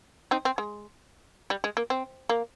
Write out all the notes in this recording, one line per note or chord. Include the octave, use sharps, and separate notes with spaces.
C4 D#4
C4
G#3
G3
G#3
A#3
C4
A#3